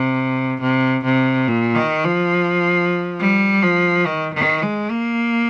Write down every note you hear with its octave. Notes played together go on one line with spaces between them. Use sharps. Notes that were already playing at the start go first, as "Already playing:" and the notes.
Already playing: C3
C3
C3
A#2
D#3
F3
G3
F3
D#3
D#3
G#3
A#3